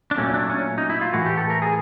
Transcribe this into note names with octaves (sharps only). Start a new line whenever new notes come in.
D4
A#2 F#3 A3 C#4
D4
C#4
D#4
E4
F4
A2 E3 A3 F#4
G4
A4
A#4
G#4